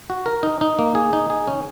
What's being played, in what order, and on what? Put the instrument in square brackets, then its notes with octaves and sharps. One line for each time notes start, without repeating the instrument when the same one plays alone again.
[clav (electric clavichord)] F#4
A#4
D#4
D#4
A#3
G#4
D#4
G#4
C#4